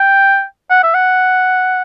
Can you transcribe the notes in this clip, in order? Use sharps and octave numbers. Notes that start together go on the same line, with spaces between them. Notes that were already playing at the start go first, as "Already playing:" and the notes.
Already playing: G5
F#5
E5
F#5